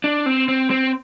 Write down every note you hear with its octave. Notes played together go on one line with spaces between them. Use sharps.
D4
C4
C4
C4